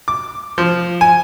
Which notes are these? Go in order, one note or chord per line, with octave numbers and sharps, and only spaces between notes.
D6
F3
G#5